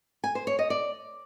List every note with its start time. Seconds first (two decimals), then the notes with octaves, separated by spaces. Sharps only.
0.24 G#5
0.35 C5
0.47 C#5
0.59 D#5
0.70 D5